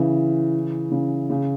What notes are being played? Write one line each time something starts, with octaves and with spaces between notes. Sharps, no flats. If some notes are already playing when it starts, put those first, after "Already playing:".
Already playing: C#3 E3
C#3
C#3